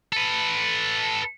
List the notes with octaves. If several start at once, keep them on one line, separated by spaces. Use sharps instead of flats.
A4 B4